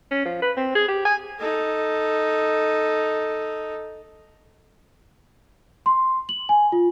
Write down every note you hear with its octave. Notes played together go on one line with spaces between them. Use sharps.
C#4
F3
B4
C4
G#4
G4
G#5
D#4 A4
C6
F#7
G#5
F4